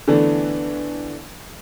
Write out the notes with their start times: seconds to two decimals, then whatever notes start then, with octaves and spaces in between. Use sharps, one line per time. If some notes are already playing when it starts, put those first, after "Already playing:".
0.08 D3 E3 A3 B3 D4